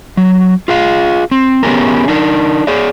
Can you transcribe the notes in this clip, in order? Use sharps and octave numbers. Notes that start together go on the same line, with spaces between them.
F#3
F4 G#4 F5
C4
B3 C#4 E4 G4 G#4 A#4
D4 D#4 A#4
G#4 C#5 D5